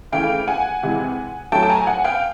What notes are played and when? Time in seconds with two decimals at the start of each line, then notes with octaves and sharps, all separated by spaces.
0.12 C#3 E3 A3 F5 G5
0.48 F#5 G#5
0.83 C3 E3 G#3
1.52 A2 F#3 A3 G5 A5
1.63 A5
1.70 G#5 A#5
1.87 F#5 G#5
2.04 F5 G5